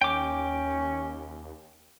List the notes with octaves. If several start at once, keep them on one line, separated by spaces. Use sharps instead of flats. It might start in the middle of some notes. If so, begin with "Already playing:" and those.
D#2 C#4 G5 D6